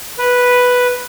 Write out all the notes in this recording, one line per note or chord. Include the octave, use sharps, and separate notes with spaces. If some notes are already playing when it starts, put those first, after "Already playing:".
B4